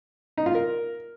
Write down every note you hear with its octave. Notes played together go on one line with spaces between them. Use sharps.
D#4
F4
A#4